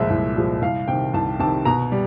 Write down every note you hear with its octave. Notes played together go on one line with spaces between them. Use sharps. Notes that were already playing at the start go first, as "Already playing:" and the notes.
Already playing: C2 A#2 F3 G#3 E5
C2
A#2 F3 G#3
C2 F5
C3 D#3 G5
C2 A5
C3 D#3 A5
B2 A#5
G3